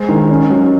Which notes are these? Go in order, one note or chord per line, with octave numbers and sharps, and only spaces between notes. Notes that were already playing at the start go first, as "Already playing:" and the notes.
Already playing: G#3 C5
D#3
C#4
F#3